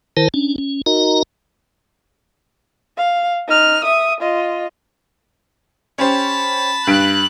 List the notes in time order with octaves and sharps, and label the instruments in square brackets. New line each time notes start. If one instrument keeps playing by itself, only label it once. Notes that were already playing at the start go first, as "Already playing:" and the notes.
[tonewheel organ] D#3 E4 A#4 C5 A5
C#4 D4
C#4
D#4 F#4 A#4 D#5 A#5
[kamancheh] F5
D#4 F6
E5 D#6
F4 D#5
[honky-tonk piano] C#4 G4 C5 [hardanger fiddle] A5 B5
[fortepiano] G2 [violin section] F#6 [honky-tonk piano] B6 D7